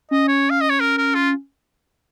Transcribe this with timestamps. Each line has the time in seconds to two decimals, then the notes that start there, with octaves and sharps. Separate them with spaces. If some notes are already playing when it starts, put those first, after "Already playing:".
0.11 C#4 D#5
0.28 C#5
0.50 F5
0.61 D#5
0.70 C#5
0.80 A#4
0.98 A#4
1.14 F4